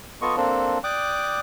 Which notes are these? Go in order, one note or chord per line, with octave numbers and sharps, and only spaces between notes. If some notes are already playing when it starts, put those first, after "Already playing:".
B3 F4 A4 D#5 C#6
A#3 C4 D4 A4
D5 G5 D6 D#6 F#6